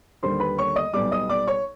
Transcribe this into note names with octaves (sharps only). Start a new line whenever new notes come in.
D#2 D3 G3 A#3 C5 C6
B4 B5
C#5 C#6
D#5 D#6
B1 B2 G3 D5 D6
D#5 D#6
D5 D6
C#5 C#6